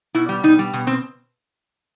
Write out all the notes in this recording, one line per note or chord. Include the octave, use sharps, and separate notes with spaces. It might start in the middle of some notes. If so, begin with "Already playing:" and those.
B2 E4
G3
B2 D#4
G3
B2
C4